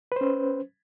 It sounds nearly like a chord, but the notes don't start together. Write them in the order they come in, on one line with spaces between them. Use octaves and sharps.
B4 C5 C#4